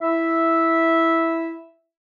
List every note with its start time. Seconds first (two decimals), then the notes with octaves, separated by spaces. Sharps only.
0.02 E4 E5